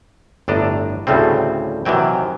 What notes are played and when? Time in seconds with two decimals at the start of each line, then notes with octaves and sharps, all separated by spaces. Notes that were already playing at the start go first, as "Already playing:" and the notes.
0.48 G1 A2 D4 D#5 A#5
1.07 D2 A2 C#3 G3 C4
1.85 C3 D#3 E3 F#3 G5